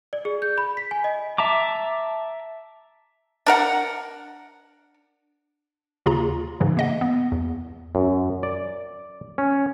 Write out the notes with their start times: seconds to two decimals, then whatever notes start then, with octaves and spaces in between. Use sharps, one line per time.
0.13 D5
0.25 G#4
0.42 G6
0.58 B5
0.77 B6
0.91 G#5
1.04 D#5
1.38 E5 A5 A#5 D6
3.46 D4 A#4 F#5
6.06 D#2 C#3 F4 G#4 A#5
6.60 G#2 C#3 E3 F#3
6.77 A#3 D#5 F#5
7.01 B3
7.32 E2
7.95 F#2
8.43 D5
9.38 C#4